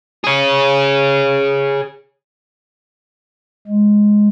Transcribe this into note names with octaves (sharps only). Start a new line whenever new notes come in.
G#4 C#5
G#3